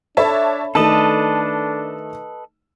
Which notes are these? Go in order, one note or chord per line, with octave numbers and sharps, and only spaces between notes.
D4 A4 C#5 E5 A5 B5
D#3 A3 D4 A4 B4 D#5 A5